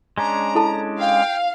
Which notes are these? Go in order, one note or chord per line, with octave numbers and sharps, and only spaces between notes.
G#3 C#4 D4 A#5
E4 A4 A5
F5 G5